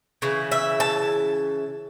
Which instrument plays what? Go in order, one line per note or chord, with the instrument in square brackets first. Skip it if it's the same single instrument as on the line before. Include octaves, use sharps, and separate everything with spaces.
[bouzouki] C#3 E3
E5
A5